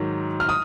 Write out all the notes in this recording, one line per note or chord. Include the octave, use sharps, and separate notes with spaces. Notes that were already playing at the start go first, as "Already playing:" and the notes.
Already playing: G#2 D#3 F#3
F6
D#6